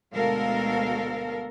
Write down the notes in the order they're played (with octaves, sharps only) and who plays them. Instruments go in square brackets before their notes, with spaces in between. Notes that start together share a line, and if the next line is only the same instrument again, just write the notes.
[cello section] D2 B2 G#3 A4 A#4 F5